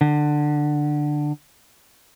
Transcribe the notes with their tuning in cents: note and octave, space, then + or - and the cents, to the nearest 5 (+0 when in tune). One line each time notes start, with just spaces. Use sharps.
D3 +15